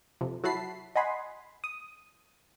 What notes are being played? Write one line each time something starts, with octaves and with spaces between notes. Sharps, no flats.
F2 C3
F#3 E4 F#4 A5 B5 C7
D#5 F#5 G#5 B5 C6
D#6